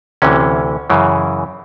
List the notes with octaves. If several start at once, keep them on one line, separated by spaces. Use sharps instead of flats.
D2 C3 E3 C#4
F#2 C#3 E3